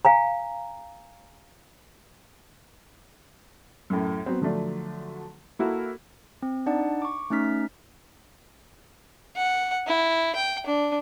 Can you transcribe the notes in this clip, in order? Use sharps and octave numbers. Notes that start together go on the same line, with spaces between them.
F5 G#5 A#5
F#2 A2
F#3 B3 C4
D3 F3 F#3 A3 D4
A#3 E4 F#4 A4 A#4
C4
D4 D#4 D5 F#5 A5
C#6 D6
A3 C#4 D#4 F6 B6
F#5
E4
G5
D4